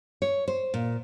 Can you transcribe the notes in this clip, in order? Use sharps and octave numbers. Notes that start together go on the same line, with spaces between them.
C#5
C5
A#2